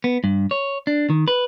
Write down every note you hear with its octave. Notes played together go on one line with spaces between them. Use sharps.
B3
G2
C#5
D4
D#3
B4